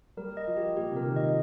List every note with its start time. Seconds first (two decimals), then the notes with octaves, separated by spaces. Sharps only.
0.17 G3 A#4
0.37 D#5
0.47 F3
0.57 G4
0.77 A#2 G4
0.91 C3
0.96 A#4
1.06 D#3
1.16 F3 D#5